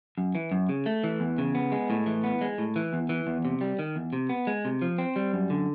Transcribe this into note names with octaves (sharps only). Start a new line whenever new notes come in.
F#2
E3
F#2
C#3
A3
E3
E2
C#3
B3
G#3
A2
E3
B3
G#3
A2
E3
E2
E3
E2
C3
G3
D#3
E2
C3
B3
G#3
C3
F3
C4
G3
F#2
D3